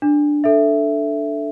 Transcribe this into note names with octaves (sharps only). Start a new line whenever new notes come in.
D4
A4 E5